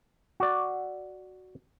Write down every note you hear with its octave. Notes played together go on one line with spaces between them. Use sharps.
F#4 D5